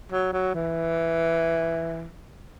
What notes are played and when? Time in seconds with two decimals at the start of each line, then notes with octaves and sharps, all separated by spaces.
0.12 F#3
0.33 F#3
0.54 E3